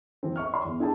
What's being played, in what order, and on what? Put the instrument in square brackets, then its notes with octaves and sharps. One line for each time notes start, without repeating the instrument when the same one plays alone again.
[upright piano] E3 C4
E5 C#6 F6
C#5 D5 E5 C6
E2
D4 E4 G#4 D5 G5 A5